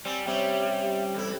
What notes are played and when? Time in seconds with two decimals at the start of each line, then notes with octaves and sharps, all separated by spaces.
0.05 G3 C4 G#5
0.27 C3 G3 C#4 E5
1.14 E2 E4 A4